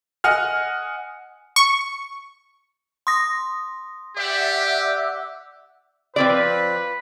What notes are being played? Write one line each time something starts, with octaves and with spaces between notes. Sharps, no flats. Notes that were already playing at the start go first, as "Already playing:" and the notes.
D#5 F#5 G#5 F6
C#6
C6 D#6 A#6
G4 D5 E5 F#5
F3 C4 B4 D5